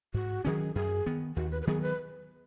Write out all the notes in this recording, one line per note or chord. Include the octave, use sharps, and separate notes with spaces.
G#2 F#4
D#3 F#3 C#4 G#4
F#2 G#4
D#3 B3
D#2 F#4
B4
B4
D#3 F#3 B3 G#4
B4